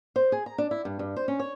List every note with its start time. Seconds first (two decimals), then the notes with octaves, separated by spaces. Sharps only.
0.16 C5
0.32 G#4
0.46 A#5
0.58 D4
0.71 E4
0.85 G2
0.99 G2
1.16 C5
1.28 C#4
1.39 C#5